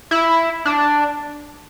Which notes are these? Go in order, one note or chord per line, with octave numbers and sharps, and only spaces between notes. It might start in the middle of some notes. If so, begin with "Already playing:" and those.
E4
D4